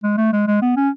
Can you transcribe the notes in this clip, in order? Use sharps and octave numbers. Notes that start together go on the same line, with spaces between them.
G#3
A3
G#3
G#3
B3
C#4